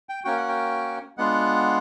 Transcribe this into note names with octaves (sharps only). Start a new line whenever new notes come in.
G5
A#3 C#4 F#4 G5
F#5
G5
G#3 B3 D4 F4 F#5